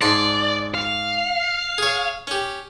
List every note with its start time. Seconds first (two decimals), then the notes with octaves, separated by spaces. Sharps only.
0.01 G#2 D5 A5 C6
0.74 F5
1.78 G#4 C#5
2.27 C#4 G4